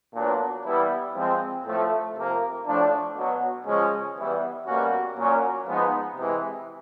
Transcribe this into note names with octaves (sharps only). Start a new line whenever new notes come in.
A#2 F#3 B3 D4
E3 G3 B3 E4
F3 G#3 C4
A2 F3 A3
C3 F3 A#3
A2 F3 A3 D4
B2 F#3 B3
C#3 F3 G#3 C#4
E3 G3 B3 E4
B2 G3 A#3 C#4 F#4
A#2 F#3 A#3 C#4
F3 G#3 B3 D#4
C3 E3 G#3